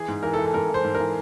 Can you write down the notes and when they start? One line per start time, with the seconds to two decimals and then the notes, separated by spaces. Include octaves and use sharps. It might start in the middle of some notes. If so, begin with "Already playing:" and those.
Already playing: E3 G#4
0.08 G#2
0.23 E3 A#4
0.33 A4
0.38 E3
0.46 A4
0.54 G#2 A#4
0.70 E3 C5
0.84 G#2
0.95 A#4
1.00 E3